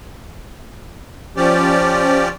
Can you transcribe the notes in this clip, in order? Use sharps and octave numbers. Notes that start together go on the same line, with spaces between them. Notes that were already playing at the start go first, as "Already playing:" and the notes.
F3 C#4 G4 D5